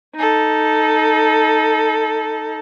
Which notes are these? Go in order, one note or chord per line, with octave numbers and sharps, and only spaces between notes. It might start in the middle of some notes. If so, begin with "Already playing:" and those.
D#4 A4